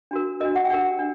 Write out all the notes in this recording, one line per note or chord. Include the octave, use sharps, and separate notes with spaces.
D4 F#4 A#4
D4 F#4 A#4 D#5
F#5
G5
D4 G4 A#4 F#5
D4